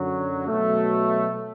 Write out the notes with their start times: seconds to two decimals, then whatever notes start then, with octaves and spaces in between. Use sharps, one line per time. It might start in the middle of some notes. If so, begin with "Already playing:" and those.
Already playing: F#2 D3 F#3
0.47 B2 F#3 A3